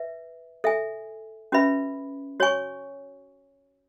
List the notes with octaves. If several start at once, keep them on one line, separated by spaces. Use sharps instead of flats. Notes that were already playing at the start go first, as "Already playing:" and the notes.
Already playing: B4 E5
A4 E5 G#5
C#4 F#4 B4 E5 B5
F#4 C#5 G#5 C#6